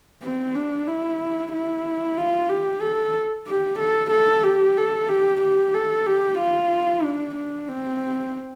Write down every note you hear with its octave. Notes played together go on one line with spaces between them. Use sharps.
C4
D4
E4
E4
F4
G4
A4
G4
A4
A4
G4
A4
G4
G4
A4
G4
F4
D4
D4
C4